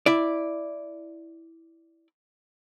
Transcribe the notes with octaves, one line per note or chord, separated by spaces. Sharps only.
E4 D5